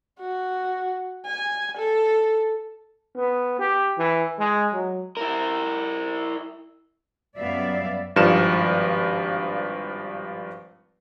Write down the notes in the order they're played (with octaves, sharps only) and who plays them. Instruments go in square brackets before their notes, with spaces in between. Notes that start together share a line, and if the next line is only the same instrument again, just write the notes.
[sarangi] F#4
G#5
A4
[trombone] B3
G4
E3
G#3
F#3
[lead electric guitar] E4 A#4
[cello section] F#2 G3 B3 D5 E5 F5
[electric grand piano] G#1 G2 F3 F6 C#7 E7